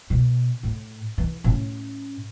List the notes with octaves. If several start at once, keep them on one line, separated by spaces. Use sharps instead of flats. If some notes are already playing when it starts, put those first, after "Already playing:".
B2
A2
E3
A2 C#4